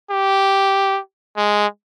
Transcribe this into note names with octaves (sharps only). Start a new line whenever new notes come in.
G4
G#3